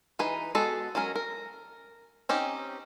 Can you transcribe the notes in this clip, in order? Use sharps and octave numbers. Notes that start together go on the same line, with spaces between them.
E3 D#4 G#4 B4
G#3 B3 F#4 A4
F#3 G#3 C#4 A#4
A#4
C4 C#4 D#4 G4